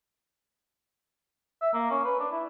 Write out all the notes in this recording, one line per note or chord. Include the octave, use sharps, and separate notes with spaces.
E5
A#3
C#4
B4
D4
E4